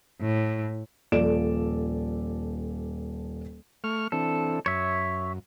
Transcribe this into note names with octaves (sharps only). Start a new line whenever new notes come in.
A2
D#1 F3 A4 D5 D7 E7
A3 C#6 F6
E3 C4 D4 A4
F#2 C#5 E5